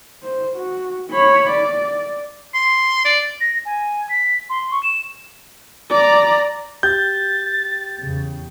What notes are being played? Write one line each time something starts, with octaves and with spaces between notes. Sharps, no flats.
C5
F#4
C#5 B5
D5
C6
D5
A#6
G#5
B6
C6
C#6
E7
D5 A#5
G4 G6 A6
E2 C#3